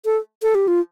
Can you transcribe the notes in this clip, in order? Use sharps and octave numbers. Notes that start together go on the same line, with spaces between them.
A4
A4
G4
F4